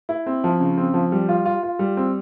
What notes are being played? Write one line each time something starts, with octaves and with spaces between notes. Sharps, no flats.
E4
C4
F3
C#3
C4
F3
G3
F4
F4
F4
G3
C4